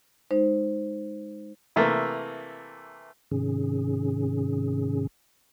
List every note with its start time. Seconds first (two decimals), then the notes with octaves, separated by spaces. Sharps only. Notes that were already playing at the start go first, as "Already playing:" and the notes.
0.31 G#3 D#4 C5
1.76 C3 E3 A3 A#3
3.31 G#2 C3 D#3 C#4 G#4